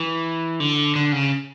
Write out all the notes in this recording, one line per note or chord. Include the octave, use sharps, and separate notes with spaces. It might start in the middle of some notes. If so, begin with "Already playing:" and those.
Already playing: E3
D3
D3
C#3